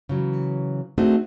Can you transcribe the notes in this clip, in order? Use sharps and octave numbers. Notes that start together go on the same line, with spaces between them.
C#3 E3 F#3
A3 C4 D4 D#4 F#4 G#4